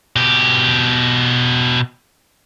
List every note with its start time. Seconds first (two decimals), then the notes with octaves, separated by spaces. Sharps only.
0.16 B2 G4